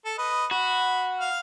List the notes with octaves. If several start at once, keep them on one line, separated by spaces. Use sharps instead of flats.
A4 A5
B4 D#5
F#4 B5
F5 F6